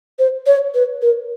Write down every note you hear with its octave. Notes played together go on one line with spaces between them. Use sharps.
C5
C#5
B4
A#4